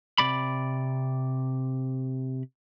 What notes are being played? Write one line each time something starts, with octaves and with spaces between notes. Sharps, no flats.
C3 D5 B5